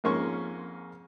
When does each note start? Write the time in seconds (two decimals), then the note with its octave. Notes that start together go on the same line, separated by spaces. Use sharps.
0.04 F2 G#2 A#3 C#4 C6 C#6